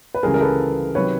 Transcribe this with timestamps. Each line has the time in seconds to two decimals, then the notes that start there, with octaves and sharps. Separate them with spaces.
0.15 B4
0.23 C#2 C#3 E3 G3 G#4 A#4
0.34 A#4
0.41 A4 B4
0.95 C3 D#3 F#3 B4 C#5